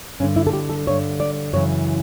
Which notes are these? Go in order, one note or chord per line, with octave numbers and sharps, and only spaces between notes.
G2 D3 C#4
E4
A4
G4
A4
G2 D3 C#5
D5
F#2 C#3 E3 C#5